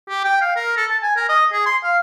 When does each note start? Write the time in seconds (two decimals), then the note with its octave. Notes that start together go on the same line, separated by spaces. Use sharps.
0.09 G4
0.25 G5
0.42 F5
0.56 A#4
0.77 A4
0.90 A5
1.03 G#5
1.17 A#4
1.29 D#5
1.52 G#4
1.66 C6
1.84 F5